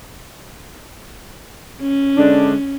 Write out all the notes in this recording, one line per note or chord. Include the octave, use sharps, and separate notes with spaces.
C#4
D3 G#3 D4